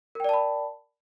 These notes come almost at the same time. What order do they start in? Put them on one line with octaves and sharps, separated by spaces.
A#4 G5 D5 A5 B5